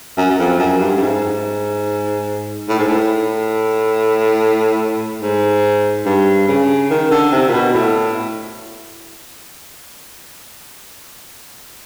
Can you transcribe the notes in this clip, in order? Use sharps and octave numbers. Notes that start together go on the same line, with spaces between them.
F#2
F#2
F2
F#2
G2
G2
G#2
A2
G#2
A2
G#2
G2
C#3
D#3
D3
C3
A#2
B2
A2